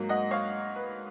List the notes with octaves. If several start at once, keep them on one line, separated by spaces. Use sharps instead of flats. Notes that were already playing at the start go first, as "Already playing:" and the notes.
Already playing: G#2 F#3 A#3
D#5 F#5
C#5 F5
B4